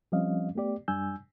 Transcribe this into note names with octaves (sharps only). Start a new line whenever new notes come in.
F3 G3 C4 C#4 D#5 F5
A3 B3 G4 D5
F#2 G3 D4 G#5 E6 G6